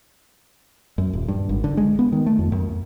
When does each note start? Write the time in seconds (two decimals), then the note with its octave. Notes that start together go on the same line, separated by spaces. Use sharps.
0.98 F#2
1.13 D#1
1.28 G2
1.49 G#1
1.64 D3
1.77 G#3
1.99 B3
2.12 D#3
2.26 A3
2.39 F2
2.52 F#2